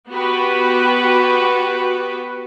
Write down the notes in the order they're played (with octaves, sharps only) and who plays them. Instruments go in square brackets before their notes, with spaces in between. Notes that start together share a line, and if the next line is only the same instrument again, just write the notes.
[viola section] B3 F#4 G4 B4